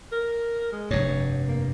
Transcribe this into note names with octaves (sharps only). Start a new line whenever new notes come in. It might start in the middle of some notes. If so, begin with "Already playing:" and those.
A#4
G#3
F1 G2 C#5
A#3